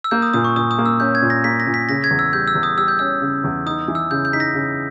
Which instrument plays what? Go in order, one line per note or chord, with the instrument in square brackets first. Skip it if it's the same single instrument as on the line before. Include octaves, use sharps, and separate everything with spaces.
[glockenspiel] E6
[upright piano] A#3 [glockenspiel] G6
[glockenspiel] D#6
[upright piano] A#2 [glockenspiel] D#6
[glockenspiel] C#6
[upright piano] A#2 [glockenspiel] D#6
[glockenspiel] D#6
[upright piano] A#3
[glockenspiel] E6
[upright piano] C#4 [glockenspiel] G6
[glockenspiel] G#6
[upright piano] A#2
[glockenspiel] A#6
[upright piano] A#3 [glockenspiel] B6
[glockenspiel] A#6
[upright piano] A#2
[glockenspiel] B6
[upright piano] C#3 [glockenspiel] A#6
[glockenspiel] G#6
[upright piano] E2
[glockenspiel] E6
[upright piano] G3 [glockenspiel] G6
[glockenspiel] E6
[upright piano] E2
[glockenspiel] D#6
[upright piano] G3 [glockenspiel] E6
[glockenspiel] G6
[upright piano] C#4 [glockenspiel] E6
[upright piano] C#3
E2
[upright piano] D#4 [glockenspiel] D#6
[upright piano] E3
[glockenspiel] E6
[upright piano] C#3 [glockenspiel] G6
[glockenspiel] G6
[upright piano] D#4 [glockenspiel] B6
[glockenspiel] A#6
[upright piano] C#3